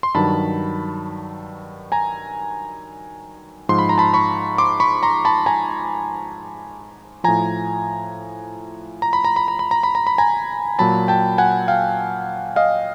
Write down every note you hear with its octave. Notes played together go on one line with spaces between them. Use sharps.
C6
G2 D#3 F#3 A5 B5
G#5 A#5
G#2 F3 C6
B5
A#5
A5 B5
B5 C#6
C6 D6
B5 C#6
A#5 C6
A5 B5
G#5 A#5
A2 F3 G#5 A#5
A#5
B5
A#5
B5
A#5
B5
A#5
B5
A#5
B5
G#5 A#5
A#2 F#3 A5 B5
G5 A5
F#5 G#5
F5 G5
D#5 F5